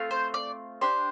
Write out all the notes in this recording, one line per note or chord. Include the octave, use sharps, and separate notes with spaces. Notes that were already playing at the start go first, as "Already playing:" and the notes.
Already playing: A3 C4 F4
C5
D5
D4 G4 C5